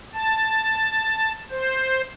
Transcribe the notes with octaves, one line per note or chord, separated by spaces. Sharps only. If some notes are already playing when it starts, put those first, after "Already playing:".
A5
C5